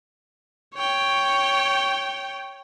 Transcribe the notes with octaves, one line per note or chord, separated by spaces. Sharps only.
C#5 G5